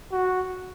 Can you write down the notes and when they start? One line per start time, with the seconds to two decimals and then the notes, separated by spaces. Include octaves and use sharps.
0.12 F#4